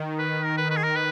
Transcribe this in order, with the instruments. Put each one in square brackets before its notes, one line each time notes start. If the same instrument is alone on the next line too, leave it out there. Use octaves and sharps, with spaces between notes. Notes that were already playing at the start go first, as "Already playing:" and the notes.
Already playing: [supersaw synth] D#3
[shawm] B4
A#4
B4
B4
G#4
A#4
B4